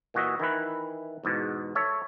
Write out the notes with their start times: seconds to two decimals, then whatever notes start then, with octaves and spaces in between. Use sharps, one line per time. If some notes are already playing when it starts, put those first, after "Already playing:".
0.14 A#2 E3 F#4 D#5 E5
0.40 D#3 E3 E4 B4
1.24 E2 G#2 B2
1.75 A4 C#5 E5